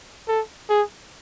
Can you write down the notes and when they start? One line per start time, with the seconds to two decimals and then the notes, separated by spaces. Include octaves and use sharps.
0.28 A4
0.69 G#4